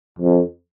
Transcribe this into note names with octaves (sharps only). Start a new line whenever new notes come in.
F2